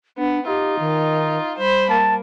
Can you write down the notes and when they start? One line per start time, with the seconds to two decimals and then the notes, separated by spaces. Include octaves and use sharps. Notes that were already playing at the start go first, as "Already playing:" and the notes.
0.18 B3 D4
0.47 D#4 F4 G4
0.79 D#3
1.57 G3 C5 B5
1.90 A#3 A5